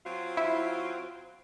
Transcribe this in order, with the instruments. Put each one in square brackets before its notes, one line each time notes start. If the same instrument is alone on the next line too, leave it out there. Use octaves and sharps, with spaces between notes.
[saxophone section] F#3 C4 F4
[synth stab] E4